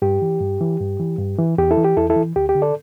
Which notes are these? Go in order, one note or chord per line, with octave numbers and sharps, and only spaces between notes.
G2 G4
E3
G2
E3
G2
E3
G2
E3
E2 G4
E4 A4
E3
G4
E2 E4 A4
E4 A4
E3
D2 G4
G4
D3
A4 D5